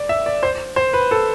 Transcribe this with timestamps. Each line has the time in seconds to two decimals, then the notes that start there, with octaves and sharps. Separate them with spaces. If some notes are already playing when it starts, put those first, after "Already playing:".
Already playing: D5
0.09 E5
0.26 D5
0.43 C5
0.76 C5
0.93 B4
1.11 A4